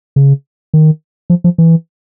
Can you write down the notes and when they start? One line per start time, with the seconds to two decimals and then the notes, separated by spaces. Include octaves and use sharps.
0.16 C#3
0.74 D#3
1.30 F3
1.44 F3
1.58 E3